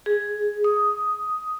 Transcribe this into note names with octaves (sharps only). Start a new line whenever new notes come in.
G#4
D#6